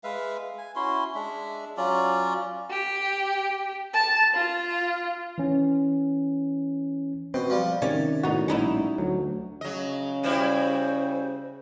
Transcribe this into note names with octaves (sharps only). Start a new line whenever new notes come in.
G#3 B4 E5 F5
G#5
C#4 E4 F#4 C6
G#3 D4 E5
F#3 C#4 F4 D5
G4
A5
F4
E3 C#4
B2 C4
F3 G3
C3 D#3 C#4 D5
A2 B3 D#4 F#4
A#1 G3 C#4 D#4 E4
D2 F#3
C#3 F#3 D#5
G3 E4 F#4 C5